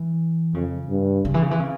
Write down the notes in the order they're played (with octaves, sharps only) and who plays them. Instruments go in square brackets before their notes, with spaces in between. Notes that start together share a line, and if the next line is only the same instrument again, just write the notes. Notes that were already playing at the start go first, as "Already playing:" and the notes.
Already playing: [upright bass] E3
[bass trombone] F2 [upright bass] C#3
[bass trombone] G2
[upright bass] C#3
E3
C#3
E3
C#3